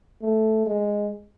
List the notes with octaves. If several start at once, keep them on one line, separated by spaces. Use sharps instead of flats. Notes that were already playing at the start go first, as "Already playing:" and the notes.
A3
G#3